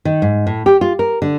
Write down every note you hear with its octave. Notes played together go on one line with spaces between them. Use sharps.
D#3
G#2
A2
G4
F4
A#4
D3